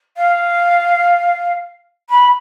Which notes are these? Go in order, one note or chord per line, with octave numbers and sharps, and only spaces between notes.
F5
B5